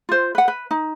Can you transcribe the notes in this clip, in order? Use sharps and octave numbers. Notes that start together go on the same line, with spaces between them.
F4 C5
B4 F#5
B4
D#4